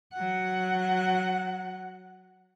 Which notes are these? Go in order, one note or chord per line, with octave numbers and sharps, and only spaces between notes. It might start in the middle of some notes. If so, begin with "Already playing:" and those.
F#3 F#5